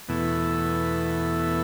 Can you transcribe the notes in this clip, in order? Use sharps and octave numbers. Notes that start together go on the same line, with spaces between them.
E2 B2 A3 E4